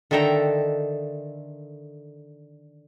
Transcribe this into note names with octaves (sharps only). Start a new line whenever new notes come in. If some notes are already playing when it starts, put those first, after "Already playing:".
D3 D#3 A4 E5 G5 A#5